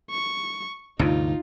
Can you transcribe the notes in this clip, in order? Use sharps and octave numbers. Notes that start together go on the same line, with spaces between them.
C#6
D2 G2 C3 D#4 F4